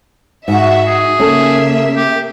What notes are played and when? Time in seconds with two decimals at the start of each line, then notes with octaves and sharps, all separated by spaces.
0.48 G#2 F#4 E5
0.86 G#4
1.20 C#3 A#3 C#4 A4 E5
1.96 G4